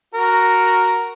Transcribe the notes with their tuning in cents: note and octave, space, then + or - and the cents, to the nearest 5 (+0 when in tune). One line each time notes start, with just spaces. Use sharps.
F#4 +0 A#4 +0